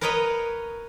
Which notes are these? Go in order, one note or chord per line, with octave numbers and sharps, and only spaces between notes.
A#4 B4 C#5 D#5 A#5 B5